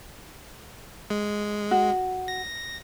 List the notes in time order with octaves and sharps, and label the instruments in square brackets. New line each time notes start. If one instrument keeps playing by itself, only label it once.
[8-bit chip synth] G#3
[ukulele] F#4
[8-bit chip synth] A#6